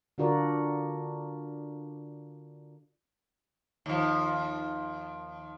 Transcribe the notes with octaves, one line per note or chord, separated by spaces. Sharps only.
D3 D4 F4 F#4 A#4 D5
D#2 F3